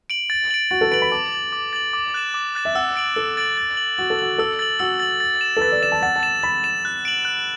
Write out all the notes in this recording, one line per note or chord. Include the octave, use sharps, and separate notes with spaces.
D7 F#7
A6
D7 F#7
F#4 A6
A4
B4 D7 F#7
B5
A5 D6
A6 F#7
D6
A6 F#7
D6
F#6 A6 E7
D6
F#6 A6 E7
E5
F#5 E6
A6 D7 F#7
A4 E6
A6 D7 F#7
A6
F#7
F#4 A6
A4
F#4 F#7
A4 E6
A6 F#7
F#4 E6
A6 F#7
A6
E7
A4
B4 A6
D5
D5 E7
A5
F#5 A6
A5
E7
B5 A6
E7
F#6
D7 F#7
F#6